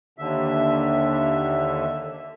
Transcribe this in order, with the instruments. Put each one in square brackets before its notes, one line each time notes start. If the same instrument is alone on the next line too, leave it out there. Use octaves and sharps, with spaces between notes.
[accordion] D#2 D3 E5